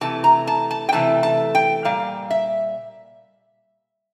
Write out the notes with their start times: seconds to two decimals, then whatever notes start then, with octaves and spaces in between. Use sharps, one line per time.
0.01 C3 E3 A3 A5
0.24 A#5
0.47 A5
0.71 A5
0.89 G5
0.92 C3 E3 A3 A5
1.23 A5
1.55 G5
1.85 A#2 G3 F5
2.30 E5